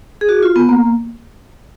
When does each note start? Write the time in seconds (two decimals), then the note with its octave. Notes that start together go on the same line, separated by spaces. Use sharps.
0.21 G#4
0.29 F#4
0.43 F4
0.56 B3
0.69 A#3